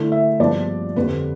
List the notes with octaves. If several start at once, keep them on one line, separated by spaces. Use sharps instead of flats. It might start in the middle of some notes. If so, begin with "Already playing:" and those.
Already playing: D3 A3 E4
E5
G2 F3 B3 D4 D5
F2 D3 G3 B4